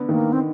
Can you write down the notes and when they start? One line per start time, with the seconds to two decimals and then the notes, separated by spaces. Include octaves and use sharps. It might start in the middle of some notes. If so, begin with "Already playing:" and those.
Already playing: D3 B3
0.08 D#3 A#3
0.33 C4